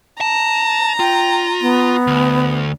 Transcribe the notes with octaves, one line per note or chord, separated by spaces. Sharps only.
A5 A#5
F4 G5
B3
D2